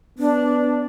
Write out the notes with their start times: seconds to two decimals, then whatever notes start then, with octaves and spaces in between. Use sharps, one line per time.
0.19 B3 D4